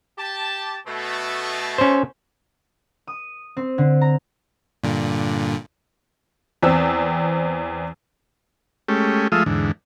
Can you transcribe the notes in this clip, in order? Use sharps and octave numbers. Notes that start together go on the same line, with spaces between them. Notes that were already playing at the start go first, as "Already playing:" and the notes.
G4 A5
B2 A3
C#4 C5
D#6
C4
D3
A#5
G2 A#2 D3
E2 C4 E6
G#3 A3 C#4 G4
F3 G#3 A3 F4 E5 D#6
E2 G#2 D3